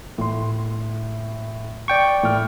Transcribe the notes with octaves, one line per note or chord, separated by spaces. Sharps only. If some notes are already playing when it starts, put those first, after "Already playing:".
A2 C6
D5 G5 C#6
A2 F6